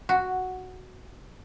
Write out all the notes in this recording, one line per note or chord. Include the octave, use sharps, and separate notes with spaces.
F#4